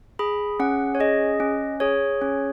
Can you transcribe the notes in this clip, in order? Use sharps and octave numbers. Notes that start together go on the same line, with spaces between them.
G#4 B5
C#4 F#5
C#5
G#4 D#5
C#4
G#4 C#5
C#4